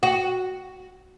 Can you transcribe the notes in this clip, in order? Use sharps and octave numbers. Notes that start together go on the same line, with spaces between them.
F#4